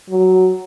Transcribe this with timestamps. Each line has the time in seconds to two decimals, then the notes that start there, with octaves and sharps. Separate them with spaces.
0.10 F#3